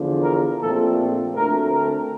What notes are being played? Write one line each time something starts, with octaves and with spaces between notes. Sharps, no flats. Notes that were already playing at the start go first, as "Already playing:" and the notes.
Already playing: E2 D3 F3
A#4
A#1 A#2 F3 A3 C4 A4
D2 D3 A3 C4 A#4
A#4